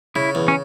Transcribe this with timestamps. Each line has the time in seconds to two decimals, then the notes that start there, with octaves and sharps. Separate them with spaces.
0.16 C#3 E4
0.35 E2
0.48 C#4